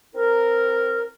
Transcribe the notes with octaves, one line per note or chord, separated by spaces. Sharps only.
C4 E4 A#4